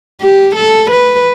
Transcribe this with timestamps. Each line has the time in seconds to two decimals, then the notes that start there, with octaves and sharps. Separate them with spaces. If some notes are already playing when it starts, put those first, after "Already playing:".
0.21 G4
0.56 A4
0.91 B4